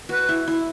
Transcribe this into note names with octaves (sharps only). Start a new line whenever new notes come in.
F#4 B4
E4
E4